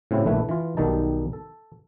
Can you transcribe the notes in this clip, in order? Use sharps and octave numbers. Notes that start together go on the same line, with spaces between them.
A2 C#3 F#3 C4 E4
A#1 D3 D#3 A3 E4 B4
E3 F4
B1 D#3 G3 D#4 A5
A4